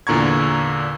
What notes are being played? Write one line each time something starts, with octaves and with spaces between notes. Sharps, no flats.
E2 A#2 D3 A#5 C#6 G#6